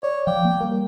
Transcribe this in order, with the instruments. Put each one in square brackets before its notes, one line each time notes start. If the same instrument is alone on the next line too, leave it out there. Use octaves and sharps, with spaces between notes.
[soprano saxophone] C#5 [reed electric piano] D5
[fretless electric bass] F3 [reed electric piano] F5 D6 [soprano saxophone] G5
[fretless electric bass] A#3
[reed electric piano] G3 A#4